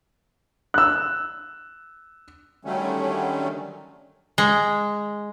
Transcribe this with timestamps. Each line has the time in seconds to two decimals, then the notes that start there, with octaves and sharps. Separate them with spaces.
0.74 E6 F#6
2.65 D3 D#3 F#3 G3 A3 C#4
4.38 G#3